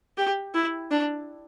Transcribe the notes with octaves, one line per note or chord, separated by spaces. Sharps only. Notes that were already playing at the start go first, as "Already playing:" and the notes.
G4
E4
D4